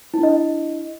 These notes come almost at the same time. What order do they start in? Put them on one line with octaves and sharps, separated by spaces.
E4 D4 D#5